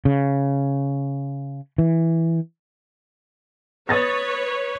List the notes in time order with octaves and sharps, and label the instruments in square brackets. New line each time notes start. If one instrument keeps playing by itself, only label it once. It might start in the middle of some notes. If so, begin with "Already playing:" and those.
[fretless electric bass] C#3
E3
[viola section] B4 C#5 [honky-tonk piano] D#6 A6 A#6